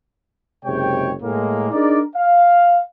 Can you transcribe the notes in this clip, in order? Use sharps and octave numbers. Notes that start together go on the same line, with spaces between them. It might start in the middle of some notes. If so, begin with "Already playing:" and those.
F#1 C3 G#3 C#5 G5
A2 G#3 A#3
D4 D#4 G#4 A#4 D5
F5